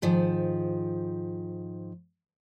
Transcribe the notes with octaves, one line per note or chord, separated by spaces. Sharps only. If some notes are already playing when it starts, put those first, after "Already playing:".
G#2 D#3 F3